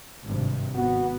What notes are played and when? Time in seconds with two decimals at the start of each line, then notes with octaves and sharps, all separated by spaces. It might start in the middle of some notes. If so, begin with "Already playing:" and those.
0.24 G#1 G2 C3
0.75 G#1 B3 F#4